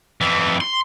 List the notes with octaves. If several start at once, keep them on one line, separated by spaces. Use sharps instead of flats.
F2 E3
C6